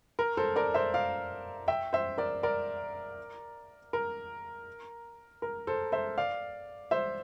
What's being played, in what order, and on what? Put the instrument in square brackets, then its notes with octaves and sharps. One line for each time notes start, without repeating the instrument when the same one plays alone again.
[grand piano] A#4
A4 C5
A#4 D5
C5 E5
D5 F5
E5 G5
C5 E5
A#4 D5
A#4 D5
A#4
A#4
A4 C5
C5 E5
D5 F5
C5 E5